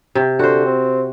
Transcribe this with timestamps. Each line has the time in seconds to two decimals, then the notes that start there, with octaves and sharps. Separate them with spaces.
0.15 C3
0.39 D3 F#4 C5
0.66 C4